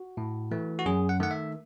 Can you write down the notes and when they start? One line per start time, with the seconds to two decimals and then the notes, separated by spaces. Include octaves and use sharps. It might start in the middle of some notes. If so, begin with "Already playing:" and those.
Already playing: F#4
0.17 A2
0.51 E3 A3
0.79 F#4
0.86 F#2 G#4
1.09 F#5
1.20 D#3 A3 F#5
1.31 E5